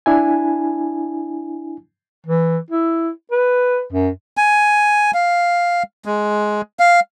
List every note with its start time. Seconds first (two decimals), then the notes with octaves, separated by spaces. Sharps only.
0.06 D4 E4 G#5
2.27 E3
2.71 E4
3.32 B4
3.93 F#2
4.37 G#5
5.14 F5
6.05 G#3
6.79 F5